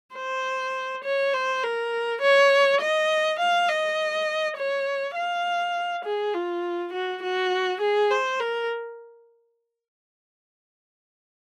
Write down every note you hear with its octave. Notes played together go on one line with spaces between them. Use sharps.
C5
C#5
C5
A#4
C#5
D#5
F5
D#5
C#5
F5
G#4
F4
F#4
F#4
G#4
C5
A#4